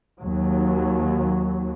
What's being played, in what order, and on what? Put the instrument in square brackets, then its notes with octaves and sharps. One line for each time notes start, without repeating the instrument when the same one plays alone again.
[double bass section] D#2 F#3